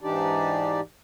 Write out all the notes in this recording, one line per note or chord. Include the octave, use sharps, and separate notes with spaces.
G#2 E3 D4 D#4 G4 D5